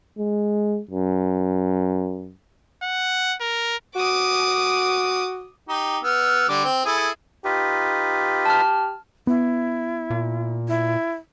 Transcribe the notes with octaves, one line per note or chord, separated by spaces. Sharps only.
G#3
F#2
F#5
A#4
F#4 D6 D#6
D#4 G4
B3 E6 F6
D3 G3 D6
C4
E4 G#4 A4
D#4 F4 G4 B4
A5 F6
B3 E4
A#2
E4